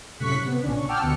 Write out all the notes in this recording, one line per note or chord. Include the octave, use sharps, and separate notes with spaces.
F#2 A2 C3 C#6 F#6 B6
C3 B3
A#1 C#3 C#4 D4
C#6
F#5 G5 A5 D6 E6 F6
D2 B2 C#7